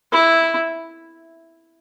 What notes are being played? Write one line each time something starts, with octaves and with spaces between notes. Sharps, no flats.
E4